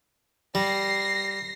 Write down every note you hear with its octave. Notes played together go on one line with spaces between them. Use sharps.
G3 A#6 C7